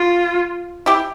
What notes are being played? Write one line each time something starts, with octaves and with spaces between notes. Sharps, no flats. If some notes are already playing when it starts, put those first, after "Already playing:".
Already playing: F4
E4 G4